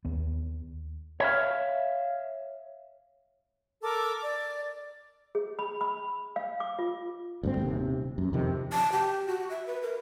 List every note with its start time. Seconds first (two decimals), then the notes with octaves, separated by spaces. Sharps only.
0.05 D#2 B3
1.20 C#5 E5 F5
3.82 A4 A#4 D6 E6
4.22 D5 D6
5.35 G#4
5.59 B5
5.81 B5
6.36 F5
6.60 D6
6.79 F4
7.43 D2 G2 C4
7.57 D#1 D#2 C3
8.18 F#2
8.33 F2 C3 D#3
8.72 A5
8.92 G4
9.27 F#4
9.50 E5
9.66 B4
9.82 A#4